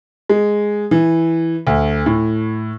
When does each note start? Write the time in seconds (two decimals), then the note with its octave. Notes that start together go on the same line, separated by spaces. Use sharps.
0.29 G#3
0.91 E3
1.67 D2
2.06 A2